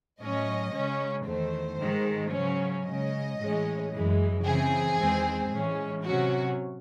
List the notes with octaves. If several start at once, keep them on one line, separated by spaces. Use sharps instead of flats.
A2 F#3 C#4 D#5
C#3 G#3 C#4
E2 D#3 A3 C5
G#2 D#3 G#3
C#3 F#3 C#4
C#3 G#3 C#4 D#5
A2 E3 G#3 C#4
F#2 E3 G#3
C#3 E3 C4 G#4
E2 D#3 G#3 C4
A2 E3 G#3 C#4
C3 F#3 C#4 F#4